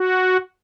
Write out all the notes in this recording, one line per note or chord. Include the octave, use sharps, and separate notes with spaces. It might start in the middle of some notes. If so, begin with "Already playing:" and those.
Already playing: F#4